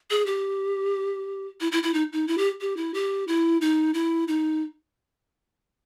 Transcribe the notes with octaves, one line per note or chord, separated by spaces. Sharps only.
G#4
G4
E4
E4
E4
D#4
D#4
E4
G4
G4
E4
G4
E4
D#4
E4
D#4